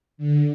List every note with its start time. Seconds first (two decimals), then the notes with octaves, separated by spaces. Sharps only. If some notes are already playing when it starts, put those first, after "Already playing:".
0.18 D3